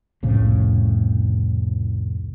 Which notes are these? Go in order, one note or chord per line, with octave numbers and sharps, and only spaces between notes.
C2 F2 A2 C#3